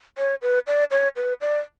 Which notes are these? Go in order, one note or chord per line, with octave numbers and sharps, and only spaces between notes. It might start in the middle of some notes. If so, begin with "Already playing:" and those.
C#5
B4
D5
C#5
B4
D5